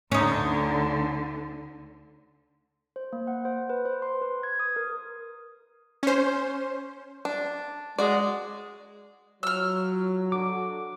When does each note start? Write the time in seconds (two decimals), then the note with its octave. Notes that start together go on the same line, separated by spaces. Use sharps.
0.12 D2 D3 C#4 D#4
2.96 C5
3.13 A#3
3.27 F#5
3.45 C5
3.70 B4
3.85 C5
4.02 C6
4.22 B4
4.43 G#6
4.60 D#6
4.76 A#4
6.03 C#4 C5
7.25 D4
7.98 G#3 F#4 D5
9.43 F#3 F4 C#5 E6 F6
10.32 D4 F#4 A4 D6